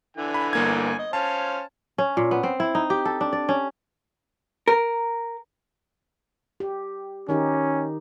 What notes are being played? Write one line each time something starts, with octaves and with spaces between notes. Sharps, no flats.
D3 E3 G#5
B5
G1 A#3 G#6
D#5
C#4 C5 F5 A5
C#4
A#2
B3
C4
E4
D#4
G4
A4
D4
D5
C#4
A#4
G4
D#3 C#4 D#4 G4